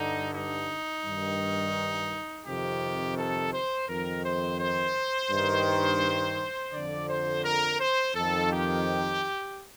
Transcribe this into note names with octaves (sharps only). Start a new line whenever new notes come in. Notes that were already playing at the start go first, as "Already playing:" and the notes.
Already playing: G2 D3 D#4
D#4
G2 D#3
F2 C3 D#3 G4
A4
C5
F2 D#3 A#4
C5
C5
G2 D#3
F2 D3 D5
C5
A#4
C5
F2 D#3 A4
G4